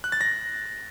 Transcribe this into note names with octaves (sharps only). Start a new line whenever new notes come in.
F#6
A6
A#6